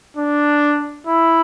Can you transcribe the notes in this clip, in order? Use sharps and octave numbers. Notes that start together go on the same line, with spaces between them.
D4
E4